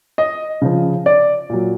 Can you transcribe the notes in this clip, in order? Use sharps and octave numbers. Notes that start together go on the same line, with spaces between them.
D#5
C#3 F3
D5
A#2 F#3